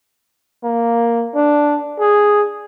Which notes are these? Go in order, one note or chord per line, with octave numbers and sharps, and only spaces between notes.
A#3
D4
G#4